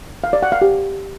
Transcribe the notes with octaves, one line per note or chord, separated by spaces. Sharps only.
F5
D5
F#5
F5
G4